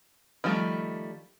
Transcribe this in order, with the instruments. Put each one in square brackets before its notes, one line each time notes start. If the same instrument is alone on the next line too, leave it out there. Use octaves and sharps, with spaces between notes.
[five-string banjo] D#3 F3 G3 A3